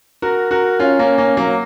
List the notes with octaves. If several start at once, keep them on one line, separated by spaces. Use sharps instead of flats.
F#4 A#4
F#4 A#4
C#4 F4
A#3 C#4
A#3 C#4
F#3 A#3